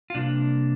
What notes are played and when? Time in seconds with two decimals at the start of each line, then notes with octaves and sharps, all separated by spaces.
0.10 F4
0.15 C3 G3 A#3 D4